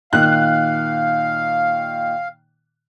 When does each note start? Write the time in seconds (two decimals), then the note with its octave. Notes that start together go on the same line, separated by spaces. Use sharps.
0.13 A#2 D#3 F5 F#6